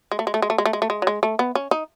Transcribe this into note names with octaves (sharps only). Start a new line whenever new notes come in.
G#3
A3
G#3
A3
G#3
A3
G#3
A3
G#3
A3
G#3
F#3
G#3
A3
B3
C#4
D#4